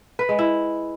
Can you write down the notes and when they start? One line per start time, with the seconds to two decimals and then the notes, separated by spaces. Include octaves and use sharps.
0.19 B4
0.29 G#3
0.39 E4